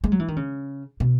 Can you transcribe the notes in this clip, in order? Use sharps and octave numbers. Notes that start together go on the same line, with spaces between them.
G#3
F#3
E3
D#3
C#3
B2